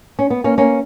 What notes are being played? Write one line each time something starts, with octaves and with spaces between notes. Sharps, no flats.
C#4
B3
A#3 C#4
A#3 C#4